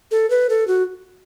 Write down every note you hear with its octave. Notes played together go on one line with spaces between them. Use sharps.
A4
B4
A4
F#4